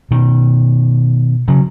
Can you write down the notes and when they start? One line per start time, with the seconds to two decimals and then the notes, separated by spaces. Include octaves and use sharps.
0.11 B2 D#3
1.48 C#3 F#3